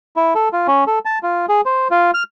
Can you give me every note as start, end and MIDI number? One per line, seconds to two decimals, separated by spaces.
0.16 0.34 64
0.35 0.49 69
0.53 0.67 65
0.68 0.84 61
0.87 0.99 69
1.05 1.19 81
1.23 1.46 65
1.49 1.61 68
1.66 1.88 72
1.91 2.11 65
2.14 2.23 89